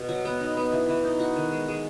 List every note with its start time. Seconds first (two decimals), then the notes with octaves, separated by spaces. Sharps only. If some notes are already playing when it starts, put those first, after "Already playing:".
Already playing: B2
0.09 F#3
0.25 B3
0.40 D#4
0.57 B3
0.72 E3
0.89 E3
1.04 D#4
1.19 F#4
1.36 D#3
1.51 G#3
1.68 G#3